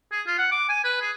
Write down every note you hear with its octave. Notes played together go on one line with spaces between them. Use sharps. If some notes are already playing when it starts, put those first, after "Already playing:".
G#4
F4
F#5
D6
G#5
B4
G#4